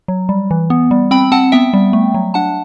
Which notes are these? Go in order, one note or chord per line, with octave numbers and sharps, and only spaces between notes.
F#3
G3
E3
B3
G3
C4 G5 B5
C4 F#5 A5
B3 E5 G5
G3
A3
F#3
D4 F#5 A5